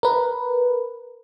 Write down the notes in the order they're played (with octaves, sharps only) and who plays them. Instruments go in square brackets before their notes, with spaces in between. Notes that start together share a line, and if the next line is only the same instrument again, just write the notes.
[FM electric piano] A#4 B4